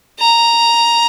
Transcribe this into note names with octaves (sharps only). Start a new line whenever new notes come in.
A#5